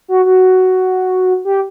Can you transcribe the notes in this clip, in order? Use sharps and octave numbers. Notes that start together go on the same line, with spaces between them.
F#4
F#4
G4